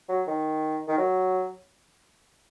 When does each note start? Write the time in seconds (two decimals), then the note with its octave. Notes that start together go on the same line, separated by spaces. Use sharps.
0.09 F#3
0.28 D#3
0.88 D#3
0.98 F#3